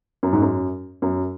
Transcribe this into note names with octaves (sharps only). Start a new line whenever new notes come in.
F#2
G#2
F#2
F#2